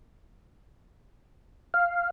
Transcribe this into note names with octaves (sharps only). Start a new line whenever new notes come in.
F5